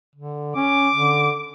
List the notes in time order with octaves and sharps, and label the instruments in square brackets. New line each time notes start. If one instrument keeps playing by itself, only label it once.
[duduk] D3
[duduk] C#4 [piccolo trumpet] D6
[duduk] D3